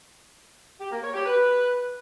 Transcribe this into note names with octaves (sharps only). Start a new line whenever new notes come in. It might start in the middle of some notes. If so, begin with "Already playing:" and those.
G4
A#3
C#5
G4
B4